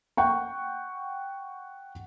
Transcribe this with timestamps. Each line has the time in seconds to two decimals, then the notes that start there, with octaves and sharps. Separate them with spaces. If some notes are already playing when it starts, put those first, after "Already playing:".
0.17 F#5 G5 C#6